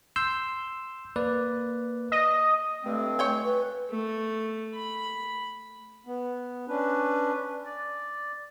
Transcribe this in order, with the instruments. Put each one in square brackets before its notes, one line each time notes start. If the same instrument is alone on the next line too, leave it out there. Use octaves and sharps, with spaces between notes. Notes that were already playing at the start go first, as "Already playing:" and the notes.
[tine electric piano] C6 E6 G6
A#3 B4 D5
[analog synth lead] D#5
[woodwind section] G2 G#3 C4 [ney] A3
[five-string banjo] C#5 G5 G#5
[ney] B4
[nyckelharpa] A3
B5
[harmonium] B3
C#4 D4 B4
D5